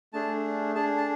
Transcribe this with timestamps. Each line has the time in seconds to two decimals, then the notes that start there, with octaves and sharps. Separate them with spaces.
0.13 A3 D4 G#4 A5
0.75 D4 G#4 A5
0.97 A5